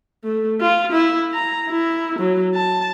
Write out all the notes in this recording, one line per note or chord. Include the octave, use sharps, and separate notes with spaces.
A3
F4
E4
A#5
E4
F#3
A5